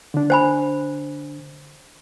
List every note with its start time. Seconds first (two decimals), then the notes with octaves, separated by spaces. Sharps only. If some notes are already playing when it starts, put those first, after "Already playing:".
0.14 D3 D4
0.30 C5 G#5 B5